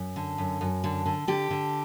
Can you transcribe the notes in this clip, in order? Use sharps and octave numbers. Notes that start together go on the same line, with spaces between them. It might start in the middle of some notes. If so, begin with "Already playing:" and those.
Already playing: F#2
D3
F#2
F#2
D3
D3
D3 G4
D3